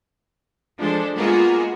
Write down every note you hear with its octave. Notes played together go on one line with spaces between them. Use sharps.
F3 G#3 D4 A4 C5
G#3 A#3 B3 F4 F#4 G#4